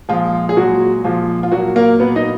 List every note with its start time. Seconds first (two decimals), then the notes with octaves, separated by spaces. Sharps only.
0.09 A#2 F3 G#3 F4
0.49 G#4
0.57 A#2 F#3 G#3 F#4
1.04 A#2 F3 G#3 F4
1.43 F4
1.52 A#2 F#3 A#3 F#4
1.76 A#3 A#4
2.00 A#2 F#3 A#3 B3 B4
2.16 D#4 D#5